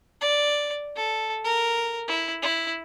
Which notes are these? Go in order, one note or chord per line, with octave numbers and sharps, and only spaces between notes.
D5
A4
A#4
E4
E4